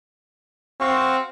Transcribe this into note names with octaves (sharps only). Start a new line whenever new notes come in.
C4 F#4 F5 C#6